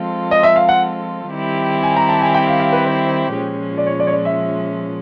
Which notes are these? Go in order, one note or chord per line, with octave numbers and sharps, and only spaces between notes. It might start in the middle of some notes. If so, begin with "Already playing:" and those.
Already playing: F3 G#3 C4 F4 A4
D#5
E5
F5
F#5
D#3 G3 C4 E4 G4
G#5
A#5
A5
G#5
G5
F5
F5
B4
C5
A#2 F3 G#3 C#4
D5
C#5
D5
C#5
D5
E5